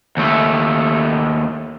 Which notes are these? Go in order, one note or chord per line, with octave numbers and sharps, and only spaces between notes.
D#2 A3